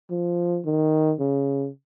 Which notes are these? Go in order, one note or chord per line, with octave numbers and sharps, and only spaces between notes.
F3
D#3
C#3